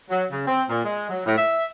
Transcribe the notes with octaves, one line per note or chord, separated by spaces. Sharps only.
F#3
C#3
C4
A#2
G#3
F#3
A2
E5